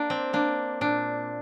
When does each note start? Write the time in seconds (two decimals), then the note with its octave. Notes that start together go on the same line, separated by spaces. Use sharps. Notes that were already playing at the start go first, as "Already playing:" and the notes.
Already playing: A#3 D4
0.10 C4
0.33 A#3 D4
0.81 A#2 D4